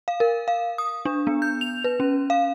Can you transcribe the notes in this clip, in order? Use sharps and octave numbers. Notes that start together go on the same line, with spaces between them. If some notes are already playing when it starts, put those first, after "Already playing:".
F5
A#4
F5
D#6
D4
B3
G6
F7
B4
C#4
F5